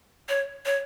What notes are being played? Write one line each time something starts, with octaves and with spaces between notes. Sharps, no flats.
C#5
C#5